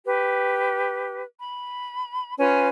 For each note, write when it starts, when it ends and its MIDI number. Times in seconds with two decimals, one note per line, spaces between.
0.05 1.21 67
0.05 1.21 71
1.39 2.34 83
2.38 2.68 61
2.38 2.68 65
2.38 2.68 71
2.38 2.68 80